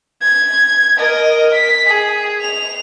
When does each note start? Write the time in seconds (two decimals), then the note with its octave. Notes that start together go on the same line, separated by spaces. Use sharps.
0.21 G#6
0.97 A#4 D#5
1.54 B6
1.87 G#4
2.41 F7